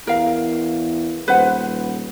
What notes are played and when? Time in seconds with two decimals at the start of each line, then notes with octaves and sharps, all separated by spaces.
0.07 E2 A#4 F5
1.28 D#1 B4 C5 F#5